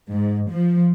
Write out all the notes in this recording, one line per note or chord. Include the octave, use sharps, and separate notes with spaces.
G#2
F3